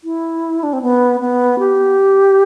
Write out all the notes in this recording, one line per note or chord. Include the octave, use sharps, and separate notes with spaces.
E4
D4
C4
B3
B3
G4